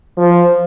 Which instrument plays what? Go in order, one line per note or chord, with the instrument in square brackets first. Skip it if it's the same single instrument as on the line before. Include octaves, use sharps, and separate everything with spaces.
[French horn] F3